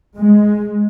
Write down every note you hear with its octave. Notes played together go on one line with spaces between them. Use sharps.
G#3